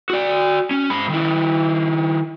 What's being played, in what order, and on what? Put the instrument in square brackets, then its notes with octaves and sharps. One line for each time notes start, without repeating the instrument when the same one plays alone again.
[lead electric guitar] F#4 D5
C#4
G#2 B5
D#3 E4